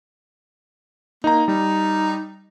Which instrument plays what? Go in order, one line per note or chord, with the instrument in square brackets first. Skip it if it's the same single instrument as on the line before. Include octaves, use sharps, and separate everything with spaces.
[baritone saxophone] A#3 [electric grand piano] D#4 A#5
[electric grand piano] G3 [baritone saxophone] D#4